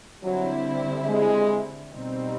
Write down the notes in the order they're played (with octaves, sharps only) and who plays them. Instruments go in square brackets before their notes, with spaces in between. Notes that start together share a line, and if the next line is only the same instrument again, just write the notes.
[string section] D3 G3 C4 E4 [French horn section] F#3
[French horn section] G#3
[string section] B2 G3 C4 D#4